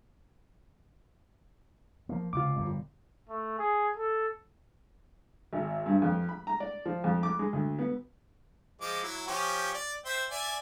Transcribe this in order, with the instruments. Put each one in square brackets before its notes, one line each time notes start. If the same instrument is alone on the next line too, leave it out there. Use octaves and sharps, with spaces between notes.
[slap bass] F3 A#3
[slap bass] C#2 C3 [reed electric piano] F4 D6
[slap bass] G1 F2 A#2
[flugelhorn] A3
G#4
A4
[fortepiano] G#1
G2
F2
B5
A#5
D5
F3
F2
D6
G#3
D2
B3
[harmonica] F3 G#3 D6
F#3 E4
F3 C#4 G4
D5
C5 E5 G5
D5 E5 G#5